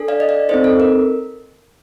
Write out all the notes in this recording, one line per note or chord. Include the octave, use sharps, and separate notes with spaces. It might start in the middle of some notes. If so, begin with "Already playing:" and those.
Already playing: D4 A4
D5 F5
D#5
D5 F5
C4 D#4 A4 C5 D#5
A4
A#4